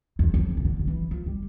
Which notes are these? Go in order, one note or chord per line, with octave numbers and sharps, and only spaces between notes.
E2
F2
C3
D3
D3
E3
F3
G3